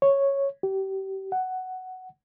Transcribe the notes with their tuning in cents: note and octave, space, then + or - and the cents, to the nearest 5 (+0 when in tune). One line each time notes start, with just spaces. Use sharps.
C#5 -5
G4 -30
F#5 +5